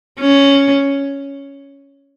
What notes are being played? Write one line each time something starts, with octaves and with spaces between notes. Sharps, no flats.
C#4